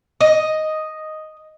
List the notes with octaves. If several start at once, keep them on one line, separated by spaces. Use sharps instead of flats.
D#5